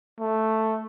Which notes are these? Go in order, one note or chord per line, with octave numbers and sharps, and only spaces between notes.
A3